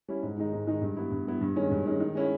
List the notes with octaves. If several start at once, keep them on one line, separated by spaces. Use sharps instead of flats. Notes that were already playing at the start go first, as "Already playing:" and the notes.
G3 C#4 E4
G#2
D#3 G#3 D#4
G#2
D#3 G#3 D#4
G2
G3 B3 E4
G2
G3 B3 E4
G2
D#3 G#3 C#4
G2
D#3 G#3 C#4
D#3
G#3 C#4 E4